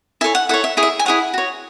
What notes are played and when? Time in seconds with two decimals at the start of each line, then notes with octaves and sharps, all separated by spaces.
0.21 E4 A4 C#5 E5 G#5
0.35 F#5
0.49 E4 A4 C#5 F#5
0.64 E5
0.77 E4 G#4 C#5
0.83 E5
0.99 G#5
1.05 E4 G#4 C#5 F#5
1.34 F#4 C#5